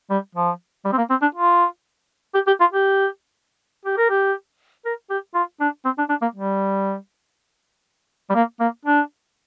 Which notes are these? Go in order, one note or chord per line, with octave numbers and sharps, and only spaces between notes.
G3
F3
G3
C4
A#3
C4
D4
F4
G4
G4
F4
G4
G4
A#4
G4
A#4
G4
F4
D4
C4
D4
D4
A#3
G3
G3
A#3
A#3
D4